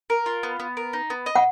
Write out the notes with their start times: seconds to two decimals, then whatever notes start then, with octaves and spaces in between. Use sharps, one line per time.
0.10 A#4
0.26 F4
0.43 B3
0.60 B3
0.77 A#4
0.93 D#4
1.10 B3
1.26 D#5
1.35 F#5